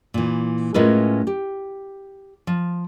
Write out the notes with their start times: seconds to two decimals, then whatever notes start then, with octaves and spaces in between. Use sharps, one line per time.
0.14 A#2 E3
0.74 A2 G#3 C#4 F4 A#4 B4
1.27 G4
2.47 F3